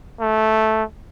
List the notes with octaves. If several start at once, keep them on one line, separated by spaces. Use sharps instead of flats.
A3